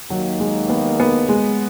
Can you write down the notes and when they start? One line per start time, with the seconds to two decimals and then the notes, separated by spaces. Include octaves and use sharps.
0.10 D#2 D#3 F#3 A#3
0.40 G#3
0.70 B3
1.00 B3
1.29 G#3